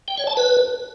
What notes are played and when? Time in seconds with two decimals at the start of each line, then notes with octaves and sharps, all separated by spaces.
0.08 G5
0.18 C#5
0.27 A5
0.37 B4